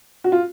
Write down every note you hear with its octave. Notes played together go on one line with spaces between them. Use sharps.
F#4
F4